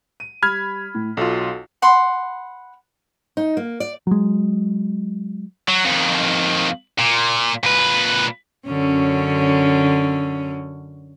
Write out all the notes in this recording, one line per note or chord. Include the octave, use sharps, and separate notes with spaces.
D#7
G3 B5 F6 G#6
A2
B1 F4 F#4 A4
F#5 B5 C6
D#4
A#3
D5
F#3 G#3
F#3
F2 D#3
A#2
A#2 B4
F#2 D3 C#4